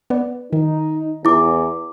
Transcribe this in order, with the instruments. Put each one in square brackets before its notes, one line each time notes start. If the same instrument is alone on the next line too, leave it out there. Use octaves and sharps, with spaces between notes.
[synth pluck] B3 B4 D5
[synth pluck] D#3 [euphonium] D#4
[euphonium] E2 [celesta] E4 D6